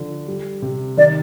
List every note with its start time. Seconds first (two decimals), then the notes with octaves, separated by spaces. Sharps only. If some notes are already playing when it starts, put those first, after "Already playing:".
Already playing: D3 F3
0.27 G3
0.62 C3
0.97 D#3 D5